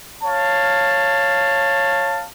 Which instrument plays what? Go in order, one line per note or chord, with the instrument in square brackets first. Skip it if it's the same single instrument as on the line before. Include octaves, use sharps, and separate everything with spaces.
[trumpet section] C#5 F5 A5